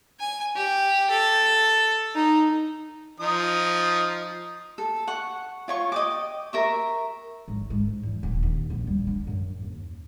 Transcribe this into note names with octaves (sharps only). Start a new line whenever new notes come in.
G#5
G4
A4
D#4
F3 D#4 D#6
A4
F#5 C#6
F4 C#5 C#6
D#5 G5 D6
A#4 E5 C#6
G#1
G#2
E2
D#1
D#2
A#1
G3
D4
F#2
D#2